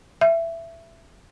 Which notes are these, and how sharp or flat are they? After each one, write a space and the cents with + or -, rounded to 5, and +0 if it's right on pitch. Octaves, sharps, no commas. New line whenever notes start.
E5 +15